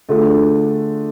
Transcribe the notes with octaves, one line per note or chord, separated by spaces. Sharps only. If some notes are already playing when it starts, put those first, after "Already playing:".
D3 A3 D4 F4 G#4